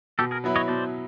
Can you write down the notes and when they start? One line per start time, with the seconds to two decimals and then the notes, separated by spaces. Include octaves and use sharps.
0.19 B2 G4 A4
0.31 G#4 A#4
0.44 F#3 B3 E4
0.56 C#5 D#5
0.68 B2 C5 D5